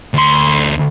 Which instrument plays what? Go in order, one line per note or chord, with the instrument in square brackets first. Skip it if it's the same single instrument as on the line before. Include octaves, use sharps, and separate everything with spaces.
[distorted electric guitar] D2 C6